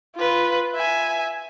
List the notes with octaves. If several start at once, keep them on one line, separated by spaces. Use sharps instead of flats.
F4 B4
E5 G#5